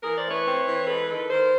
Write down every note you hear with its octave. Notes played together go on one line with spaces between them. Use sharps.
E3 G#4 A#4
C5 D5
A3
B4 C#5
C4
E3
G#3 A4 B4
D#3 A4 B4
D#3 A#4 C5